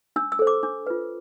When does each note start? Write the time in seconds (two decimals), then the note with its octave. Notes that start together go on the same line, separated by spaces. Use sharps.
0.16 D4 E6
0.32 E6
0.39 A4 C5
0.47 D6
0.63 D4 D6
0.87 F4 B4